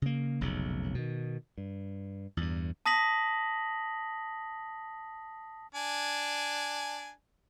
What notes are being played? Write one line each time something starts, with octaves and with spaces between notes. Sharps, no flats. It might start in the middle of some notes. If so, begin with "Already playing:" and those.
C#3 A#3
F1 B1 C#3
B2 D#3
G2
E2 G2
A5 D#6 A#6 B6 F#7
D4 G#5